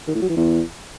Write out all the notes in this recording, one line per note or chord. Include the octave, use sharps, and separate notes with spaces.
D#3
A2
F#3
E3
E2